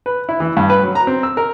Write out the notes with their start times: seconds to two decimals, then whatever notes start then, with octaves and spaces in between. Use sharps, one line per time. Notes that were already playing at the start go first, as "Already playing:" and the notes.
0.06 B4
0.29 E4
0.40 E3
0.57 G2
0.70 B4
0.83 F#3
0.95 A#5
1.07 C4
1.23 E6
1.37 A#4